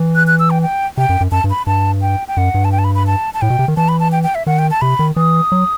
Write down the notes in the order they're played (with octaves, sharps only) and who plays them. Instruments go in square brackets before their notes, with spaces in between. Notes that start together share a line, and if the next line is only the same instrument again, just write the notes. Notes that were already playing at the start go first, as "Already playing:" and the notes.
Already playing: [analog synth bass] E3
[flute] F#6
F#6
E6
G5
G5
[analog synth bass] C3 [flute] G5
[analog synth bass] F#2
F#2
[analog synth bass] F#2 [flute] A5
[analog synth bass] G2
[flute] B5
[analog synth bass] G2 [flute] A5
[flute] G5
G5
[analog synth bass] F#2 [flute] F#5
[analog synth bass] G2
[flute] A5
G5
A5
B5
B5
A5
A5
[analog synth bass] A2 [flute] G5
[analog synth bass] B2
C3
D#3
[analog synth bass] E3 [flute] A5
[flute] B5
A5
G5
G5
E5
[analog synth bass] D#3 [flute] F#5
[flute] G5
A5
[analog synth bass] C3 [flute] B5
[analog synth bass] D#3
[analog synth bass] E3 [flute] D#6
[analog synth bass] F#3